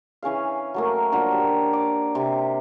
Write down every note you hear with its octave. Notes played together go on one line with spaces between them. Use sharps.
E3 C#4 G#4 F5
F#3 A3 A#3
F3 F#3 A#3 D4
G4
D6
C3